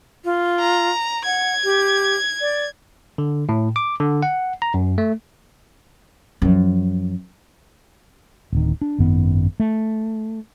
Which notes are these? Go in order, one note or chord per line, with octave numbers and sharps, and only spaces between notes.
F4
A#5
F#5 G#6
G4
D5
D3
A2
D6
D3
F#5
A#5
F#2
A3
F#2 F3
D1 D#3
D4
G#1 F#2 D#3 B3
A3